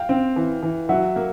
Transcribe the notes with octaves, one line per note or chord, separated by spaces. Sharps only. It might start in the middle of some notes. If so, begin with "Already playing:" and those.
Already playing: F5 G5
C4
E3
E3
F#3 E5 F#5
A#3